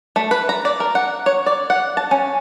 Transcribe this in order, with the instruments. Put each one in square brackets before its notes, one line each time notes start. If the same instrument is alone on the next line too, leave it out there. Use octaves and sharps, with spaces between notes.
[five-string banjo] A3
B4
A#5
D5
A#4
F#5
C#5
D5
F#5
A5
C#4